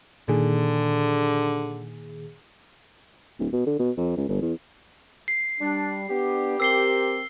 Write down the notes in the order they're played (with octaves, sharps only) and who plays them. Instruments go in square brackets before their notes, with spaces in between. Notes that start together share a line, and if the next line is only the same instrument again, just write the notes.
[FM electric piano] A#2 D#3 G#4 [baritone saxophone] D3
[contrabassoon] D1
B2
D3
B2
F2
C#2
G1
E2
[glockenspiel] C7
[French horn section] G3 [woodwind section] D4
[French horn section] B3 D4 [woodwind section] G4
[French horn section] C4 A#4 [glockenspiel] E6 C7 G7